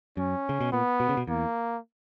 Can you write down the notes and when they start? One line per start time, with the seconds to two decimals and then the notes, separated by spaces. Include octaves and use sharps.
0.17 F#2 C#4
0.49 C#3
0.60 B2
0.72 A#2 B3
1.00 B2
1.09 C#3
1.17 B2
1.27 E2 A#3